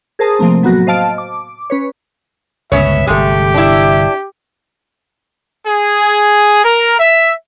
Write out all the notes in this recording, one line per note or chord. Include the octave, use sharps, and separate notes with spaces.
G#4 A#4 C5 A5 D#6
C3 F3 A3 A#3 C4
A2 F#3 A#3 B3 F#4 A#6
C5 D#5 F5 A5 F6 D7
D6
C#4 B4 C#5
G1 C#2 C#3 B3 C#4 C#5 E5
G1 C3 G#3 A3 G4
D4 E4
G#4
A#4
E5